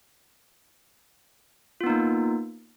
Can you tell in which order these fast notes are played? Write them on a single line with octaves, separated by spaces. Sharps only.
F4 B3 D#4 A#3